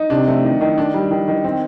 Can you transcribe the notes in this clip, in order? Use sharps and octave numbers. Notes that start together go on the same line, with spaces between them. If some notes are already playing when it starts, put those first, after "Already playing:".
Already playing: D#4
C3 D4
A3
D#3
D#3
D4
G3
D#3
D#3
C4